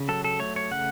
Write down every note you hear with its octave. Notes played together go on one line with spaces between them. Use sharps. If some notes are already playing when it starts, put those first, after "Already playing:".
Already playing: C#3
F#3 A4
A4
A3 C#5
C#5
C#3 F#5